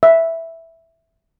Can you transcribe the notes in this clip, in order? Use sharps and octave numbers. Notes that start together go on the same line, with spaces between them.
E5